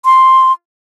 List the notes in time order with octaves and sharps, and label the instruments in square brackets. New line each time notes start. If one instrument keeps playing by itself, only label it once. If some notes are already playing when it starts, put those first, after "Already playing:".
[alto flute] C6